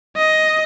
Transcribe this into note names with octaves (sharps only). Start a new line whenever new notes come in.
D#5